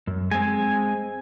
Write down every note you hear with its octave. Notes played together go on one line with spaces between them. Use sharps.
F#2
G#3 C4 G#5